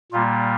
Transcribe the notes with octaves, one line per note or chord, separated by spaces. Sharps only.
A#2 G3 A#3 F4